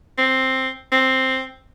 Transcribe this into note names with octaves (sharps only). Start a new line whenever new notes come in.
C4
C4